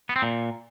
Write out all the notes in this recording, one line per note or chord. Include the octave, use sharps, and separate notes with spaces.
B3
C4
A#2